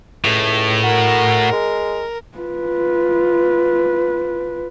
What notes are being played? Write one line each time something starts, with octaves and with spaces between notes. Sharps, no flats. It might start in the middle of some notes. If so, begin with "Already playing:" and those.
C#2 A2
F#4 A#4
G#3
F4 B4